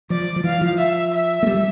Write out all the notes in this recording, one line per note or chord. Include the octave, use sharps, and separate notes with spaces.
F3 D5
F3
E3 F5
F3
E5
E5
A3
G3